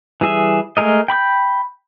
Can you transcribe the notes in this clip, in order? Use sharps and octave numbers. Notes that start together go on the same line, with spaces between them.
E3 G3 G#4 E5
G#3 A3 G#4 A#4 D#5
G5 B5 C#6 G6